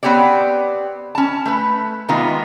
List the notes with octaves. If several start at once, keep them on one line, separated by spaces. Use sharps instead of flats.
B3 C4 G4 C#5 D5
C#4 A5
A3 B4
C3 D#3 G#3 B3 F4 A#5